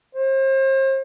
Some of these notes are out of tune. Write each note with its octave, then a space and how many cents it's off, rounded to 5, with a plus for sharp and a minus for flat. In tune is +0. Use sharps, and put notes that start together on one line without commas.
C5 +40